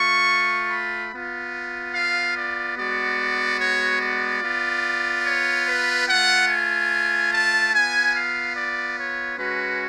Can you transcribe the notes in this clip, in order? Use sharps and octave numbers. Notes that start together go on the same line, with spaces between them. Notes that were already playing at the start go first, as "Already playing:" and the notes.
Already playing: A3 F4 C#6
B5
B3 F4
F5
D5
G#3 B3 F#4 D5
C#5
D5
B3 F4
C#5
B4
A3 F4 F#5
G#5
A5
B3 F4 G#5
F5
D5
C#5
G#3 C#4 F#4 B4